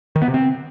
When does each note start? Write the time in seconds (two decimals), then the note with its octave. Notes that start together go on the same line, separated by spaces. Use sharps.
0.16 D#3
0.22 B3
0.28 C3
0.34 C4